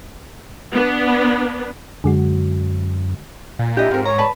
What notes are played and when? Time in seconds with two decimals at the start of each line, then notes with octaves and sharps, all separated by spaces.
0.73 B3 D4
2.04 F#2 D3 G#3 F#4
3.59 A#2
3.77 D4 E4 G4 D#5
3.91 G#2 C4 F4 A#4
4.06 C#5 A#5
4.18 B4 D5 A5 B5